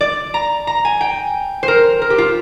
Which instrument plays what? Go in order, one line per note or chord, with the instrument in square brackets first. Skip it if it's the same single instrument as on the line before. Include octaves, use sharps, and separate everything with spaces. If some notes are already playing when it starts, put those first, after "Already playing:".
[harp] D5
A#5
A#5
G#5
G5
C5
A#4
A#4
G4
F4